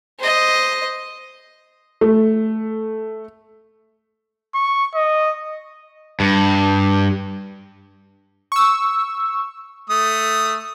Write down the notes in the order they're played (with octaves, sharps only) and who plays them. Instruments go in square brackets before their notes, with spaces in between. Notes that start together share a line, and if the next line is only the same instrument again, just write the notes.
[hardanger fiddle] C5 D#5
[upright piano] A3
[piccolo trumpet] C#6
D#5
[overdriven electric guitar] G2
[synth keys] C#6 E6
[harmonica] A3 D#6